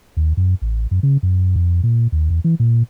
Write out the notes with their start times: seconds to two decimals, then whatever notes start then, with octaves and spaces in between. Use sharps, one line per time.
0.17 D#2
0.37 F#2
0.62 A1
0.91 F#2
1.03 C#3
1.23 F#2
1.56 F2
1.83 A#2
2.12 D#2
2.30 E2
2.44 E3
2.60 A#2